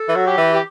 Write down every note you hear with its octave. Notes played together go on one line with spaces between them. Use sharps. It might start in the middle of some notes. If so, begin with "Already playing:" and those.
Already playing: A4
E3
F#3 F#4
G4
E3
G4